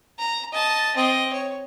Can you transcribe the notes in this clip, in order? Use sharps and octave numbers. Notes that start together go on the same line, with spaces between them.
A#5
D#5 A5
C4 D#5
C#5